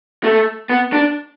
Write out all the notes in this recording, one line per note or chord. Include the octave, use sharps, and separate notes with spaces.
A3
B3
D4